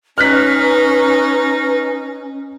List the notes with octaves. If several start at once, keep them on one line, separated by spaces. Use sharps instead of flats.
C#4 D#4 B4 F6 F#6 B6